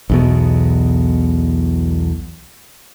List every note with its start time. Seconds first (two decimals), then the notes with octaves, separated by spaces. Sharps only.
0.10 B1 E2 B2